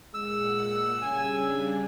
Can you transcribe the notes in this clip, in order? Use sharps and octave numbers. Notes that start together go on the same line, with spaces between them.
A#2 G#3 F#5 E6
C#3 G3 D4 G#5